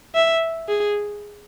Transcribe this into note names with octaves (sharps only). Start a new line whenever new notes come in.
E5
G#4